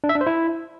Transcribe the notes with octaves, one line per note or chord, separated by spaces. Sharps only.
D4
E5
D4
C5
E4